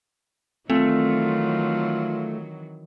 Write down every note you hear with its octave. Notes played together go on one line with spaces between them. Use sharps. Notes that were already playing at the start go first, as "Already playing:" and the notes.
D#3 E3 F#3 A3 C4 F4